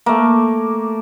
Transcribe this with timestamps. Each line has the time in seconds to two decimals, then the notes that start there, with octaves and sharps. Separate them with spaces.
0.06 A3 A#3